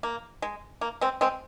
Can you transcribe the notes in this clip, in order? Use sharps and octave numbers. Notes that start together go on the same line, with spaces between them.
A#3
G#3
A#3
G#3 C4
G#3 C4